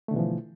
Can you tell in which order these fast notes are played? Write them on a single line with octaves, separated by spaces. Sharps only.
A3 D3 B2 E3 F3